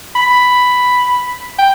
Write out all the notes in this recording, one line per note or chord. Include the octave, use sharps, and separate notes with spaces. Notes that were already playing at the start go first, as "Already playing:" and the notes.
B5
G5